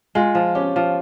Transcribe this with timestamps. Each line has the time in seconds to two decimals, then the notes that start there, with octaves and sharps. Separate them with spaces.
0.15 G#3 F4
0.35 F3
0.55 C#4 G4
0.76 F3